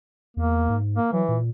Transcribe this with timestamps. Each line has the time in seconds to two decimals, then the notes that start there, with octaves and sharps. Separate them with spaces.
0.37 E2 A#3
0.69 G#2
0.97 A#3
1.13 E3 F#3
1.28 A#2